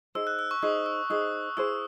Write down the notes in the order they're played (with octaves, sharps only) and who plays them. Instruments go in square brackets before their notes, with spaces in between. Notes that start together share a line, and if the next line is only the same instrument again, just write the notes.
[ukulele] D#4 G#4 C5 [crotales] E6
[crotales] F#6
E6
C#6
[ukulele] D#4 G#4 C5 [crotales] D#6
[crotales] E6
[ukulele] D#4 G#4 C5 [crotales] D#6
[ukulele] E4 G#4 C5 [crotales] E6